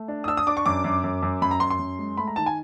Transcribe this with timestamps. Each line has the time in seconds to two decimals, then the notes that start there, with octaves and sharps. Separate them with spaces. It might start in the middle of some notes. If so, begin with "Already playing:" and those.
Already playing: A3
0.08 D4
0.24 D#6
0.28 D4 E6
0.37 D#6
0.47 D4 D6
0.57 C#6
0.66 F#2 D6
0.84 F#2
1.04 F#2
1.22 F#2
1.42 F#2 B5
1.51 A#5
1.60 F#2 C6
1.70 C6
1.79 F#2
1.99 G#3
2.17 A3 B5
2.28 A#5
2.36 D#3 A5
2.46 G#5